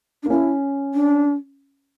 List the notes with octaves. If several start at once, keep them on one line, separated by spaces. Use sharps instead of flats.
D4
A#3
C#4 E4
D4